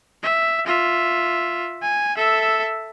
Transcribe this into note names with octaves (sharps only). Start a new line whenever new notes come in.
E5
F4 E5
G#5
A4 E5